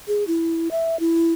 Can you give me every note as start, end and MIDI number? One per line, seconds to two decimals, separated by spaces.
0.08 0.24 68
0.27 0.68 64
0.71 0.99 76
1.00 1.33 64